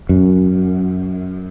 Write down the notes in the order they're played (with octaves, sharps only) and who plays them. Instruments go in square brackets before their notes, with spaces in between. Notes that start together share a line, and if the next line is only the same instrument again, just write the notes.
[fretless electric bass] F#2